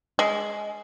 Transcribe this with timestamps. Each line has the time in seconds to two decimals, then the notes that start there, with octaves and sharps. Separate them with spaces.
0.19 G#3